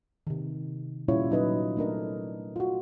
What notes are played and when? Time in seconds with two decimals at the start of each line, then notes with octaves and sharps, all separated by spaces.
0.27 C3 D#3
1.08 A#2 G3 C#4 E4 F4 C#5
1.30 F#3 D#4 B4 D#5
1.77 A3 D4 A#4 D#5
2.56 F4 F#4